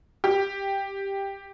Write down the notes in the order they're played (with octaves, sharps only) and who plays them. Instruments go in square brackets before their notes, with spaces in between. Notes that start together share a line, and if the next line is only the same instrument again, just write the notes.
[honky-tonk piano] G4